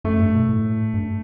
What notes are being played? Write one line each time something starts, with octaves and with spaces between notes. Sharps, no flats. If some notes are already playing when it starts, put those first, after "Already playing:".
F#2 A3
G2
B2
A2
G2